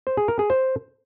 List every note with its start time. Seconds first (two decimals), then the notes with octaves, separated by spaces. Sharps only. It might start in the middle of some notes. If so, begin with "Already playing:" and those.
0.07 C5
0.17 G#4
0.28 A#4
0.39 G#4
0.50 C5